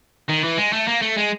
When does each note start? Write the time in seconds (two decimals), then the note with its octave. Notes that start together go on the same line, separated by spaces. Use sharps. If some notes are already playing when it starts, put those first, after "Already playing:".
0.29 D#3
0.44 E3
0.58 G#3
0.73 A3
0.88 A#3
1.02 A3
1.18 G#3